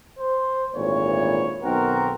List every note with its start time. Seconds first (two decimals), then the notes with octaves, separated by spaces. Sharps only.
0.19 C5
0.74 G#1 D2 A#2 E3 C#5
1.62 B1 B2 D#3 C4 F#4 A#4